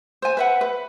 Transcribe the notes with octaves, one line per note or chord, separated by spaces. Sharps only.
C5 G#5
B4 E5 F#5
B4